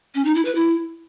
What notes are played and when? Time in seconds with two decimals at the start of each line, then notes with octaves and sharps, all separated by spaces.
0.15 C#4
0.25 D#4
0.35 E4
0.45 B4
0.55 E4